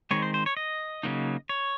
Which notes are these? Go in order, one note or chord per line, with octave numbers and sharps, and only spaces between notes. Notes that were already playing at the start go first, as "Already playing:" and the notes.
D#3 G#3 C4 C#5
C5
C5
C#5
D#5
C#3 F#3 A#3 D#4
C#5